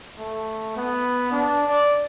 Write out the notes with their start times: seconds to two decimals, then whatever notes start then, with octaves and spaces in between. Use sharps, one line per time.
0.19 A3
0.76 B3
1.32 D4
1.67 D5